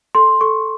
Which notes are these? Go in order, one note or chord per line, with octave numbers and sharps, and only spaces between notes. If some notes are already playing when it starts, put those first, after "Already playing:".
A4 C6
A4 C#6